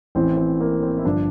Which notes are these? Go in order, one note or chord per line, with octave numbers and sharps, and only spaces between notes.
A1 A2 E3 C4
C4
A#3
C4
E4
G1 G2 D3 F3 D4